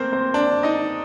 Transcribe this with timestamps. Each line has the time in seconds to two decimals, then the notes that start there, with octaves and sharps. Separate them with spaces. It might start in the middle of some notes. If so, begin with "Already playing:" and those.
Already playing: A3 A#3 C4 A#4 C5
0.12 C4 C5
0.34 D4 D5
0.63 D#4 D#5